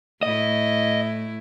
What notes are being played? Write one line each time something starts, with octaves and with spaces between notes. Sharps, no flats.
A2 E4 D#5